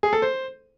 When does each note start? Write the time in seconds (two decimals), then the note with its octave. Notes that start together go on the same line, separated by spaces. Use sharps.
0.03 G#4
0.13 A4
0.22 C5